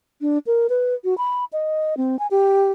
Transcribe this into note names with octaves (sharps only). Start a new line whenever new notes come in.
D4
A#4
B4
F#4
B5
D#5
C4
G#5
G4